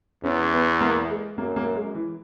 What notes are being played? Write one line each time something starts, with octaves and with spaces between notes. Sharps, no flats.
E2 C#4
B3
A#3
G#3
F#2 A#3
A#3
G#3
E3